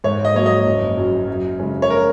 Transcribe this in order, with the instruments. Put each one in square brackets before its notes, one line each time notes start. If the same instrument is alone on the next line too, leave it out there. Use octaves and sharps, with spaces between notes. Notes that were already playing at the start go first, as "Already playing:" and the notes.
[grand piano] G#2 [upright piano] C#5
[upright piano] D#5
[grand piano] F#3 A#3 [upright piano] C#5
[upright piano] D#5
[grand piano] F#1
F#2 F#3
F#2
C#3 G#3 C#4
[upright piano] C#5
A#4